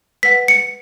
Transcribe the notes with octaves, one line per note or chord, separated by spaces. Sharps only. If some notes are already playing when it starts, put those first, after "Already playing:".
B4 F#5 B6
C#7